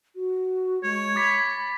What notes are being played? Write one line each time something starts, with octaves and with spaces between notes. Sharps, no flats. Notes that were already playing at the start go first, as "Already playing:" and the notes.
F#4
G#3 C#5
B5 D6 A6 B6